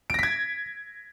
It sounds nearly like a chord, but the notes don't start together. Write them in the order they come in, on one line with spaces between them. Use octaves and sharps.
D7 A#6 B6 G#6